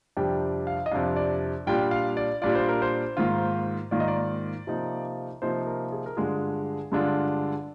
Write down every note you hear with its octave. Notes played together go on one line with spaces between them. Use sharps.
F2 C3 G3 D4 G5
F5
D#5
F2 C3 G3 D4 F5
D5
A#2 G3 D4 F4 G5
F5
D5
A#2 G3 D4 F4 D5
C5
A#4
C5
G#2 D#3 A#3 F4
G#2 D#3 A#3 F4 D5
D#5
D5
C3 F3 A#3 D#4
C3 F3 A#3 D#4 C5
A#4
G#4
A#4
G2 D3 G#3 D4 F4 G#4
G2 D3 G#3 D4 F4